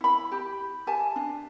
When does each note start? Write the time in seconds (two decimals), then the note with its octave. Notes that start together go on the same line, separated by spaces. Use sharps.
0.01 E4 B5
0.32 G4
0.87 G4 E5 G#5 A5
1.16 D4